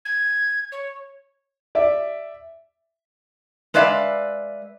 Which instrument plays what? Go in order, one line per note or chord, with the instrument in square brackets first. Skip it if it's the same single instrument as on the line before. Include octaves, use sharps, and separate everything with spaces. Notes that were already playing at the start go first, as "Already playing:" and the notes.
[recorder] G#6
C#5
[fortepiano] D5 E5
[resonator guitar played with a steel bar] G#3 B4 D5 E5 F5